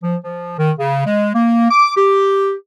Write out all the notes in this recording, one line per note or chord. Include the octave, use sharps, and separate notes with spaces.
F3
F3
D#3
C#3
G#3
A#3
D6
G4